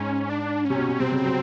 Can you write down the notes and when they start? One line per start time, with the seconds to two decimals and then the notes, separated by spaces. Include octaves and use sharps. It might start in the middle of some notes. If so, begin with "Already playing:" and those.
Already playing: G#2 C#4
0.29 D4
0.65 C#4
0.70 C3
0.76 B2
0.89 C3
1.00 C3 C4
1.12 C#3
1.24 F#3